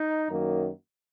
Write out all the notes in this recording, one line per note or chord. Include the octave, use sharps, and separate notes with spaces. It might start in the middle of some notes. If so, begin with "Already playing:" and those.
Already playing: D#4
F#2 D#3 F#3 A#3